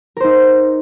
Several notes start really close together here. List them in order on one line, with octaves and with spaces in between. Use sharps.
A#4 C5 D#4